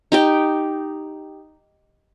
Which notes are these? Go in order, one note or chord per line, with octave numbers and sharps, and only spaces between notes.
D#4 G4 G5